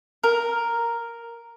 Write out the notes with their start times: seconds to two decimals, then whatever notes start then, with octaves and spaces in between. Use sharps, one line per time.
0.24 A#4